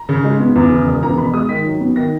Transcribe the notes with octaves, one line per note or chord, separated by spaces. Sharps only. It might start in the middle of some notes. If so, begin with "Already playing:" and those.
Already playing: A#5
C#3
G#3
B3
E2
C#3
E1
E2 A#5
B2 B5
G#3 D#6
D#3 B6
F#3
B3
D#3 A#6